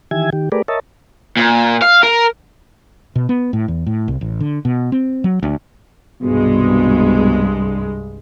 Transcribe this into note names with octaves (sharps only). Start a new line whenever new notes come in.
D#3 E3 G4 E5 G#5 G#6
D#3 G4
A3 G4 G#4 A#4 B4 D5
A#4 C#5 D#5 E5 A5
A#2
F5
A#4
B2
B3
A2
E2
A2
C2
A1
D3
B2
C4
F#3
D2
C2 G2 B2 G#3